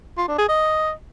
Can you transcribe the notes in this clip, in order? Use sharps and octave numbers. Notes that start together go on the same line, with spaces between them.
F4
D4
G#4
D#5